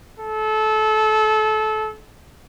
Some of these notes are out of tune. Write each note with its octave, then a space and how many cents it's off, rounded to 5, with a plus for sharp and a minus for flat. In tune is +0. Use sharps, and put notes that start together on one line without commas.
A4 -25